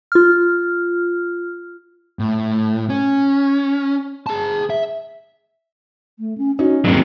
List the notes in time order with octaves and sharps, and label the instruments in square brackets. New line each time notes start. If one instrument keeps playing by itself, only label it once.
[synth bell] F4 F6
[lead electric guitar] A2
C#4
G#4 A5
E5
[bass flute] A3
C#4
[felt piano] C#4 D#4 [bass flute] F#4
[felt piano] A1 D#2 [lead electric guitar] F#3 G#3 [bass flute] C4